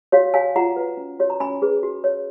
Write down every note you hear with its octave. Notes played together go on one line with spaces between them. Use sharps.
F#4 C#5 F5
C#5 F5 G#5
F4 F#5 A#5
B4
C#4
F#4 C#5
A#5
C#4 G#5 B5
G#4 B4
F#4
C#5